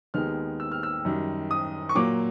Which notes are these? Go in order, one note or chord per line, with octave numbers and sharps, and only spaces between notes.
D#2 D#3 G#3 B3 F6
E6
F6
E6
F#2 D#3 G3
D#6
C#6
A#2 F#3 A#3 D6